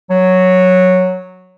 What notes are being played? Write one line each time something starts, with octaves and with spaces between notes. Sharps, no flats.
F#3